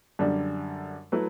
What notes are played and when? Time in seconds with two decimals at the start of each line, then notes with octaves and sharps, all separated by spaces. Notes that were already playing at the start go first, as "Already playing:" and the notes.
0.19 F#2 D3 G3 D4
1.12 F#3 A3 E4 B4